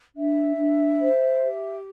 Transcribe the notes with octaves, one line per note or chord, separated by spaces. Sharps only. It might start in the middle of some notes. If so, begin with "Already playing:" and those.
D4 E5
D4
C5
G4